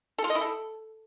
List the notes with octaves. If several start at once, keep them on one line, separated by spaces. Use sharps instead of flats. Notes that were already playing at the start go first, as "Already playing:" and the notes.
A4
F4
D#5
E4
A4